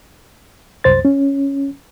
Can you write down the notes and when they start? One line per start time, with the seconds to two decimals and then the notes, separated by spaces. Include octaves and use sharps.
0.84 C2 F#2 C5 A6
1.05 C#4